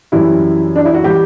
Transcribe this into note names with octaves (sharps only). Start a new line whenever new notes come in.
F#2 E3 G3 E4
D4
E4
F#4
E3 G3 G4